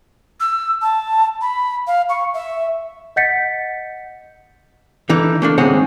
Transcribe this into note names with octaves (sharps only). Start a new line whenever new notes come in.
E6
A5
B5
F5
C#6
E5
D#5 F#5 G6 A6 B6 C#7
D3 E3 D#4
A3 A#3 D4
D#2 G#2 G#3 C4 C#4 F#5